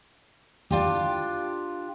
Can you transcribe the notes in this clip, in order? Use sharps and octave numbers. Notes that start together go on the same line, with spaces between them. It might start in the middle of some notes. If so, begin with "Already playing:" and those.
D4 F4 G4